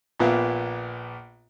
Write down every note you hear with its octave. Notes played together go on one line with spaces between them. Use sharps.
A#1 A#2 B3 E5 F5